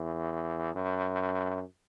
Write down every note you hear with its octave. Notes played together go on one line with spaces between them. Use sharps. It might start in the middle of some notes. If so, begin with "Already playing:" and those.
Already playing: E2
F#2